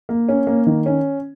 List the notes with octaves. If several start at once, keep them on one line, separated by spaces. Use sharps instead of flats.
A#3
C#4
A#3
D#3
C#4